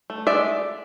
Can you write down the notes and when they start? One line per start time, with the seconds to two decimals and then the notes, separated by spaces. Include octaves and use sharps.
0.10 A3
0.27 G#3 D5 E5